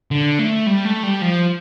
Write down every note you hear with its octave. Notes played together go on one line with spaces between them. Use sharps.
D3
A3
G3
A3
G3
F3